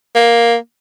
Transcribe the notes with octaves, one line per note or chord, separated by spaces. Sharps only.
A#3